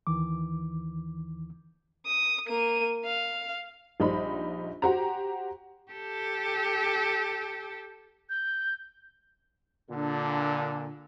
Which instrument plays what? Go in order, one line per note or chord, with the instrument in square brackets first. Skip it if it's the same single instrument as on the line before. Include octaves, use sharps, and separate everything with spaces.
[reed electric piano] D#2 D#3 E3 D6
[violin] D#6
A#3 D#7
F5
[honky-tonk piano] A#1 G3 D#4 C5 B5
F#4 G4 C5 A#5
[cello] G4 A4
[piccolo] G6
[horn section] A#2 D3 [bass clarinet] D4